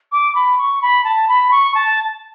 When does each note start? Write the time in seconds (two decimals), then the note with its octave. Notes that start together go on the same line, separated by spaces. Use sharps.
0.12 D6
0.35 B5
0.58 C#6
0.82 B5
1.04 A5
1.29 B5
1.51 C#6
1.75 A5